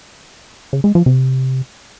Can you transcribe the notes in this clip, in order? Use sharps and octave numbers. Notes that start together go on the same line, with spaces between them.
C#3
G#3
F3
C3